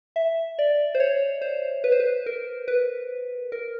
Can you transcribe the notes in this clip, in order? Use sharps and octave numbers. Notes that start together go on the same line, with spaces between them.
E5
D5
C5
C#5
C5
B4
C5
B4
A#4
B4
A#4